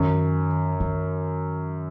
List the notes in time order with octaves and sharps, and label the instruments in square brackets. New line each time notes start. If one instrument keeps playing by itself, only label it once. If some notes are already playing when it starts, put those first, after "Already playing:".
Already playing: [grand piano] F#2 [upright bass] D#3
[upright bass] D#3